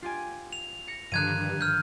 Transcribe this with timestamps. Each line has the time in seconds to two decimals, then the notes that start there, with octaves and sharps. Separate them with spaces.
0.02 F4 G4 G#5
0.53 F7
0.88 A#6 C#7
1.12 G2 D3 D#3 F3 F#6 G#6 D#7
1.61 F6 G6